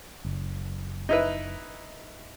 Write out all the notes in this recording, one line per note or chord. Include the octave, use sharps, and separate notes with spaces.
F#1
D#4 E4 B4